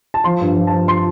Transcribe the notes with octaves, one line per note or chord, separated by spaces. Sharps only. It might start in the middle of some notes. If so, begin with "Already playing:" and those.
A5
F3 C6
G2
F3
A5
F3
C6